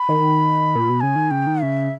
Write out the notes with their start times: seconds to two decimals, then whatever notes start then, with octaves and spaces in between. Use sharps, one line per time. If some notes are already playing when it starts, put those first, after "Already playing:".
Already playing: B5
0.09 D#3
0.75 A#2
0.89 B2
1.00 C#3 G#5
1.16 D#3
1.31 C#3 G5
1.47 D#3
1.61 C#3 E5